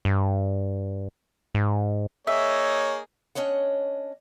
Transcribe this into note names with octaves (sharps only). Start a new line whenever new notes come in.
G2
G#2
A#3 D#4 G#4 C#5 E5
C#4 D4 C#5 D#5 F#5